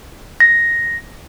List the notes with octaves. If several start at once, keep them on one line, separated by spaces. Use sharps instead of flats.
A#6